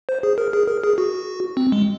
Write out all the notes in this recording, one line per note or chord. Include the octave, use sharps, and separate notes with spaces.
C5
G#4
A#4
G#4
A#4
G#4
F#4
C4
G#3